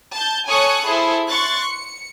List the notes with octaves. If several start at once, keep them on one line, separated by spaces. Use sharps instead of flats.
A5 G6
A4 C#5 G#5 C#6 D#6 F#6
E4 G#4 A4 C5
C6 C#6 F#6 A6
C#7